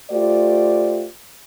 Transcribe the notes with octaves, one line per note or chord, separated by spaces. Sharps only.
A3 F4 G4 C5 D5